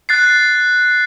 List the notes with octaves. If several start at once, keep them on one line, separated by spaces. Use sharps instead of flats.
F#6 A6 C7